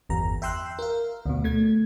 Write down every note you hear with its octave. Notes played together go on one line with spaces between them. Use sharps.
G1 E2 A#5
E5 G5 C6 E6 F#6
A#4 F5
D2 B2
A3 G#6